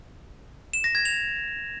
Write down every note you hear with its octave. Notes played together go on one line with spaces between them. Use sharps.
E7
A#6
G#6
F7